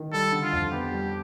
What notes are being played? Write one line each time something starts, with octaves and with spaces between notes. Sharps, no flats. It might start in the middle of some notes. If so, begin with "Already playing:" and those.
Already playing: D#3
G3 A4
D3
F4
F2
B3 G4
G3